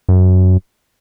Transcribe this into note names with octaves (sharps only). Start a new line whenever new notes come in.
F#2